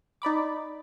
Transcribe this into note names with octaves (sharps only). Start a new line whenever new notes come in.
D#4 D5 B5 D6